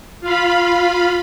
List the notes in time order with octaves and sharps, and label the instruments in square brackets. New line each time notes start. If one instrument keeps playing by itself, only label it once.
[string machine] F4 F5 B5